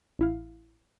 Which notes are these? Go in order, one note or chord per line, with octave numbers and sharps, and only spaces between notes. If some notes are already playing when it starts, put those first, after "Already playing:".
A1 E4 F5